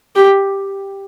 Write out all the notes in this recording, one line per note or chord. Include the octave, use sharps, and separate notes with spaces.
G4